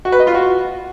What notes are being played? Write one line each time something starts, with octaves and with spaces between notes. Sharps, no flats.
F#4
B4
D#5
F4
F#4